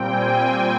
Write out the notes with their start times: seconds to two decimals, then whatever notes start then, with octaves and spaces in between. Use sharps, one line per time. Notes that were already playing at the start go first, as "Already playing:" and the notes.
Already playing: A#2 G3 C4 G5
0.09 G#5